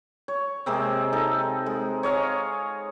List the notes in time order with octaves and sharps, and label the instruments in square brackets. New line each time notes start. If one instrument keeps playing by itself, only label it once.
[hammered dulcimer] C#5
C3 G#3 A#3 C4
D#4 A4
G#3
C#5 D#5 F5 A#5